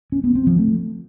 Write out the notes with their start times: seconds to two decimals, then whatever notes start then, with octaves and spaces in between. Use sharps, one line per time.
0.12 C#4
0.24 B3
0.35 C4
0.47 F3
0.58 A3